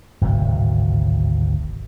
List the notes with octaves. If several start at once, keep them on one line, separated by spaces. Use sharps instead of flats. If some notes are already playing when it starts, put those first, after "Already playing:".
D1 G#1 C3 F#3